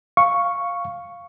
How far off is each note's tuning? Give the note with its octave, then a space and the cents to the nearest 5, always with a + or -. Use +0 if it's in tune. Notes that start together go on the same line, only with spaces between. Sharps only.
F5 +0 C#6 +0